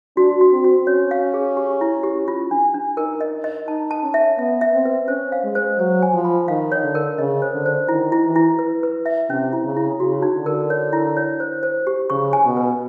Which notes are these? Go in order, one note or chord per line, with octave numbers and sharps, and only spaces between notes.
D4 F#4
F#4
C4
F#4
C#4 C#5
F5
G#4
G4
E4
G4
F4
D4
D4
D#4 A#4
D#5
D#5
D#4 A5
A5
C#4
E5
B3 E5
E5
C4
B4
C#4 C5
F5
G#3
C5
F#3 C5
G#5
F3
B5
D#3 F5
C#5
D3
A#4
C#3 D#5
C5
D3
C5
D#3 E4
E4
E3
E4
B4
B4
E5
C3 C#4
E4
C#3
E4
C#3 F#4
D#4
D3
A#4
C#5
E4
C#5
C5
C5
G4
C#3 C#6
G#5
B2
B4